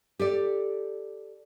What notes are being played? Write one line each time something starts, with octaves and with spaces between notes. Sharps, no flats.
G4 A4 D5